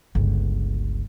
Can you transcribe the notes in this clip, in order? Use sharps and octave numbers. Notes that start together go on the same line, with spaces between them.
G1 C#2